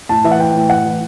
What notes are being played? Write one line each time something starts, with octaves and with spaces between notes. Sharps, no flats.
A2 A5
E3 E5
F#5
E3 G5
A2
A2 F#5
E3